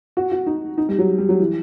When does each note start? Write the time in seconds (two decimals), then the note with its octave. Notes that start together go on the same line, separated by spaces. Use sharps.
0.17 F#4
0.32 F#4
0.46 D#4
0.78 D#4
0.89 G3
0.98 F#3
1.18 G3
1.29 F#3
1.40 E3